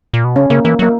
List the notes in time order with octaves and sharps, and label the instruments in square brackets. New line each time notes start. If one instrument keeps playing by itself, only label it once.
[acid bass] A#2
B2
[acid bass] C#3 [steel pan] C#4
[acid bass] C#3 [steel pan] A#3
[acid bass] E3 [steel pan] A#3
[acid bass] F#3 [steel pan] A#3